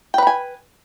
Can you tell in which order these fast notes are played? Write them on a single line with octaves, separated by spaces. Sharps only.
G5 B4 B5 G#5